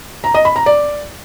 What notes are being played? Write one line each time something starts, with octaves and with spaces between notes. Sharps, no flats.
A#5
D#5
B5
A#5
D5